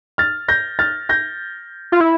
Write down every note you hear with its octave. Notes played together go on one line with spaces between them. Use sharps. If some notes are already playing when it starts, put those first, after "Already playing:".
F6 A6
G6 A#6
F6 A6
G6 A#6
F4
E4